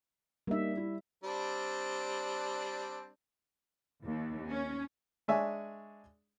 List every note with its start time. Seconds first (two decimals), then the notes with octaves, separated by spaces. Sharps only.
0.47 G3 A#3 D#4 E5
0.77 E4
1.24 G3 C4 D4
4.06 D#2
4.50 C#4
5.28 G#3 D4 C#5 E5 G#5